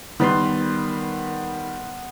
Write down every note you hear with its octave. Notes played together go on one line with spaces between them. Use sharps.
D#3 G3 B3 B4 C6